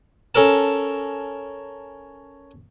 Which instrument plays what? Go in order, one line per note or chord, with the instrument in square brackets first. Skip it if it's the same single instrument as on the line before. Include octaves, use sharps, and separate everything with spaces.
[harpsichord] C#4 A4 A#4 A5